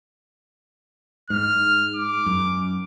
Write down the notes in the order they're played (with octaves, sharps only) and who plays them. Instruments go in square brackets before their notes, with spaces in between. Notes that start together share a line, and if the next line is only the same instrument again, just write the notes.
[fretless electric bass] G#2 [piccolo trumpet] F6
[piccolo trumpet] D6
[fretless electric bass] F#2